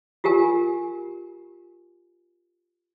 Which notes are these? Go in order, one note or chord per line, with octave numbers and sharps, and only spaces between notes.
F4 G4 A#4 G#5